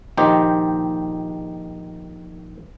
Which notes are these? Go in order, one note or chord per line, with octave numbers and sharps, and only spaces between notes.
A#1 D#3 D#4 G4 C5